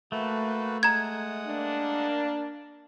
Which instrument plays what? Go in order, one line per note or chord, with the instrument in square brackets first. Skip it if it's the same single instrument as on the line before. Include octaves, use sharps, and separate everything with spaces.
[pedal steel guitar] A3 [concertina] A#3 F#4 B4
[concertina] G#3 F#5 D#6 [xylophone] A#5 G#6
[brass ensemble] A#3 D4